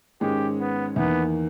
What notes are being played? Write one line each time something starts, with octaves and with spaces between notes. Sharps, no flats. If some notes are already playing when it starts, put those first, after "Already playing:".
G#2 D#3 G#3 C#4 G4 G#4
B3
E2 D#3 A#3 B3